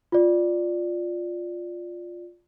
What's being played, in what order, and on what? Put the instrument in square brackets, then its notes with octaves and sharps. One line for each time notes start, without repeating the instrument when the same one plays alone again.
[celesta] F4 D5